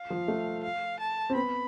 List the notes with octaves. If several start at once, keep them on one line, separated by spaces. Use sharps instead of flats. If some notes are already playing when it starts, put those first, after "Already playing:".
Already playing: F5
F3
A3
F5
A5
C4
B3 B5